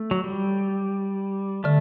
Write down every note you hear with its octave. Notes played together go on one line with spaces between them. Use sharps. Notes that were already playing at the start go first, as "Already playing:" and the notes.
Already playing: A3
F#3
G3
D3 A3